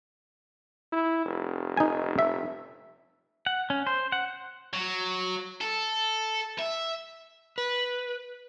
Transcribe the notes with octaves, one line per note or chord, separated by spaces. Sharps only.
E4
F1
D#4 G#5
E5
F#5
C#4
C5
F#5
F#3
A4
E5
B4